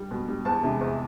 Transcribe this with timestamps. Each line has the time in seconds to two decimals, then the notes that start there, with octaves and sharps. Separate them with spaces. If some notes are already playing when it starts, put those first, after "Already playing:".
Already playing: G3
0.11 B2
0.28 G3
0.45 E2 A5
0.63 C3 E3 G#3
0.81 E2